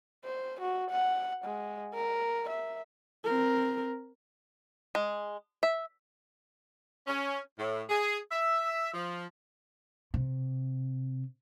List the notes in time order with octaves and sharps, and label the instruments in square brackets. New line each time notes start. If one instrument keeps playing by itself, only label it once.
[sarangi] C5
F#4
F#5
G#3
A#4
E5
[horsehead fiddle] C4 A#4
[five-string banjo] G#3
E5
[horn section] C#4
A2
G#4
E5
F3
[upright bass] C3